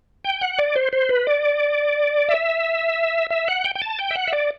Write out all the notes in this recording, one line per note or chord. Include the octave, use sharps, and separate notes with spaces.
G5
F#5
D5
C5
C5
B4
D5
E5
E5
F#5
G5
G5
A5
G5
E5
F#5
E5
D5